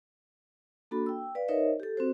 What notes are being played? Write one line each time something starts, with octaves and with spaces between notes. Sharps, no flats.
A#3 D4 F#4 A4 B5
G5 E6
B4 D5 F5
D#4 A#4 C5 C#5 D#5 E5
G4 A4
C4 F#4 C5